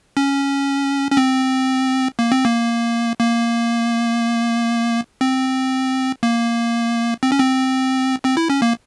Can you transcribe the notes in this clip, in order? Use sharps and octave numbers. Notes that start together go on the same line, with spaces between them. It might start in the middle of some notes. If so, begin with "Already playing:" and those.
C#4
C#4
C4
A#3
C4
A#3
A#3
C4
A#3
C4
C#4
C4
C4
E4
C#4
A#3